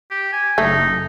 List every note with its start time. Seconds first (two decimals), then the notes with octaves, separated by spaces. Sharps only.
0.11 G4
0.33 G#5
0.58 F#1 A3 D#4